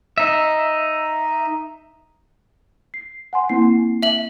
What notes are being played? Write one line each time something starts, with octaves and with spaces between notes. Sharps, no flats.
D#4 E5
C7
F#5 G#5 C6
A#3 C4 E4 C7
E5 F#7